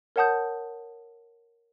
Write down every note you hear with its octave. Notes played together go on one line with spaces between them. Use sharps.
A#4 C#5 F#5 A5 D#6 G6